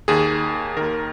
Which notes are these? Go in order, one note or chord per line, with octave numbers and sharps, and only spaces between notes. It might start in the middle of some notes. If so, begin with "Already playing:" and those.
D#2 D#3 G#4
D#2 D#3 A#4